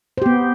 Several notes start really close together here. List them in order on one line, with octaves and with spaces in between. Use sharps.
C5 G4 B3